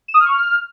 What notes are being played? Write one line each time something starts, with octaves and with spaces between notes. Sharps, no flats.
E7
D#6
F6
C#6
F6